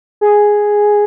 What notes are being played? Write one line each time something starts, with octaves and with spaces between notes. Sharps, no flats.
G#4